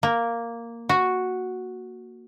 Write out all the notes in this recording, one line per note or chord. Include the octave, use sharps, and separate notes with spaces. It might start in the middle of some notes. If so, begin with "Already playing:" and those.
A#3
F#4